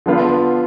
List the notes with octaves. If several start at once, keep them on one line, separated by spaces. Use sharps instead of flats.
D3 F3 B3 F4